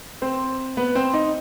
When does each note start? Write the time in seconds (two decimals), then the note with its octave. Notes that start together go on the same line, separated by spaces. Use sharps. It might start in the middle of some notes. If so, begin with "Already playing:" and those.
0.22 C4 C5
0.77 B3 B4
0.95 C4 C5
1.14 D#4 D#5